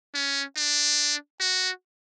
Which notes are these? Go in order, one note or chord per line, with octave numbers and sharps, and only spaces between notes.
C#4
D4
F#4